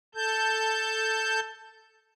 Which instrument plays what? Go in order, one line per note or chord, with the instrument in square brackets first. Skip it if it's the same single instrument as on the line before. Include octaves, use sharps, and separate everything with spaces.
[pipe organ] A4 A5 G6